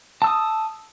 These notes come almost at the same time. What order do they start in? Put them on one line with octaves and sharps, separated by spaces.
A5 E6 D#6